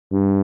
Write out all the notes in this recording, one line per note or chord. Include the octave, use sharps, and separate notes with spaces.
G2